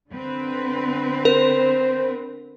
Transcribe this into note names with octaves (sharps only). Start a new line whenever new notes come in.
D3 C4 B4
A#4 C5